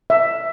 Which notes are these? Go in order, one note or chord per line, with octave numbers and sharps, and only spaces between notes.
E5